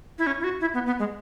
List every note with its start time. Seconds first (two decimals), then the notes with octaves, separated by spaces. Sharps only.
0.19 E4
0.27 C#4
0.40 E4
0.44 F#4
0.61 E4
0.74 B3
0.86 B3
0.99 G#3